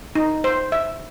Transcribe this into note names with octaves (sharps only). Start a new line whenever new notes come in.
D#4
C5
E5